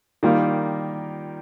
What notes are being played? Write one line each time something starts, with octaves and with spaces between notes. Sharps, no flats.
D#3 G3 A#3 F4